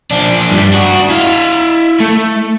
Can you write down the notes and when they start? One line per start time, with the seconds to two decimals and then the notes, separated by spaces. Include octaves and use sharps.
0.11 F3 D4
0.52 G2 G3
0.72 D4 F#4
1.09 E4 F5
2.00 A3